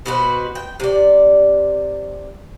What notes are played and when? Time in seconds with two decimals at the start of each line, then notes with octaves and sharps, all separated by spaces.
0.06 B2 F#4 B4 C5
0.55 G5
0.80 C3 D5